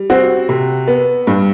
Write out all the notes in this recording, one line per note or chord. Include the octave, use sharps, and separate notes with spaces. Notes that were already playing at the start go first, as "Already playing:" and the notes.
Already playing: G3
C4 F#4
C3
B3
G2